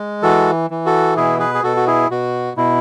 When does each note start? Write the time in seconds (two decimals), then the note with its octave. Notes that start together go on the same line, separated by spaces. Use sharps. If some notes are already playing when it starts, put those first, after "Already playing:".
Already playing: G#3
0.23 E3 F#4 A4
0.70 E3
0.86 F#4 A4
1.17 B2 E4 G#4
1.40 G#4 B4
1.55 G#4
1.63 B2 F#4 A4
1.77 F#4
1.87 E4 G#4
2.10 B2 F#4
2.57 B2 E4